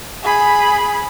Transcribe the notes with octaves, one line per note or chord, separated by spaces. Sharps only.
G#4 B5